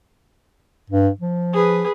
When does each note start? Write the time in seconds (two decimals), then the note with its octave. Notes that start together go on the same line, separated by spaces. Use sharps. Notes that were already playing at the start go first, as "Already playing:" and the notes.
0.90 G2
1.21 F3
1.53 G#4 B4